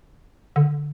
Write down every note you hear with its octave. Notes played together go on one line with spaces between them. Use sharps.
D3